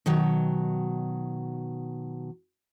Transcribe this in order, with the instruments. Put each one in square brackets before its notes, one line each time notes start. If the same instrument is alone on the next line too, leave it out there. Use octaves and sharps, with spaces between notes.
[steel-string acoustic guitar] B2 D#3 F#3